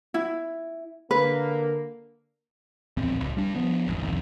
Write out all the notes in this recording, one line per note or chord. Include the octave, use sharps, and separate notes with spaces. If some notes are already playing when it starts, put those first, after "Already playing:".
E4
D3 A#3 B4
D1 A#1 E2 C4
D#1 C#2
G3 D4
F3 B3 D4
G1 E2 G#2
G1 C2 F2 D#3